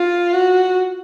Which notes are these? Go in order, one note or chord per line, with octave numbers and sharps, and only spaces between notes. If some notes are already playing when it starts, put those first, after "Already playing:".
Already playing: F4
F#4